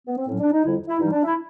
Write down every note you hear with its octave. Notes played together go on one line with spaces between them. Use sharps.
B3
C4
A2 F#3 C#4
D4
D#4
F2 D3 G3 E4
E4
G2 E3 G3 D#4
D4
E4